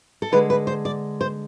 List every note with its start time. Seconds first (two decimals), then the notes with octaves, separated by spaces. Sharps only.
0.22 A4
0.32 D3 G#3 B4
0.50 B4
0.67 C5
0.85 D5
1.21 C5